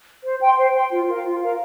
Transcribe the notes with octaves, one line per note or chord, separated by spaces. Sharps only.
C5
G5 C6
C5
G5 C6
F4
A#4 F5
F4
A#4 F5